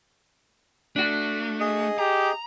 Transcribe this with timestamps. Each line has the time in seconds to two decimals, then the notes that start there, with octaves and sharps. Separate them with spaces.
0.96 A3 D4 F#4
1.60 G#4 D#5 D#6
1.99 G4 A#5